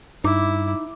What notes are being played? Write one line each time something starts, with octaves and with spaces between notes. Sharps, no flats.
G2 D#4 E4 D6